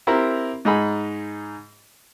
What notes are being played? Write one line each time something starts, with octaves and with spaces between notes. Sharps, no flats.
C4 E4 G4 A#4 A#5
G#2 D#4 G#4 B5